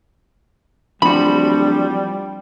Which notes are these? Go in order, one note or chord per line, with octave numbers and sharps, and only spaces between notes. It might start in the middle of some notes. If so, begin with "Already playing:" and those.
D1 F3 G3 F#4 B5